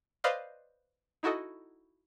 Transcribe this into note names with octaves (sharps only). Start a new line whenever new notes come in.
B4 C5 D5 D#5 F5 C6
D#4 E4 F#4 A4 D#5